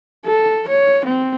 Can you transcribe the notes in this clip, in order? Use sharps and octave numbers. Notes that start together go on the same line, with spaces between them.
A4
C#5
C4